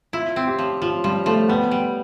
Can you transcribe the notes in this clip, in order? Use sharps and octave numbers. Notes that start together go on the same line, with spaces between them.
E4 F4
C4
G4
F3
F3 F4
F3 G3
F3 A3
G3 B3
G3